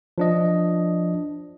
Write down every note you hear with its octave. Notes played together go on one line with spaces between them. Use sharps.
F3 D4 D#5